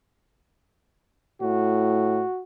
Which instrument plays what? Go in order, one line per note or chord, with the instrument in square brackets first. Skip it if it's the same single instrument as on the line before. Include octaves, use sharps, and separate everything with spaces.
[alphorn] A2 [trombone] F#4